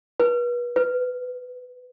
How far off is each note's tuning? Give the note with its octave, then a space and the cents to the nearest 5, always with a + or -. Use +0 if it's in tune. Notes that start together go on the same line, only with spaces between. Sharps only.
B4 -35
B4 +20